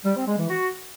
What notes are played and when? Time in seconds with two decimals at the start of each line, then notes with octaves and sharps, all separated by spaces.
0.05 G3
0.16 C4
0.27 G#3
0.38 E3
0.49 F#4